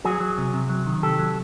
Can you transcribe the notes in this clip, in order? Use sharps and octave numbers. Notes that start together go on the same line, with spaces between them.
F#3 F#4 G#4
F#3
C3
C3
F#3
D#3
C3 G4 A4
F#3